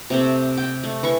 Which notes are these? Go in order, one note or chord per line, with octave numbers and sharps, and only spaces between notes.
C3 A3 C4
G5
A3
E3 E4 C#6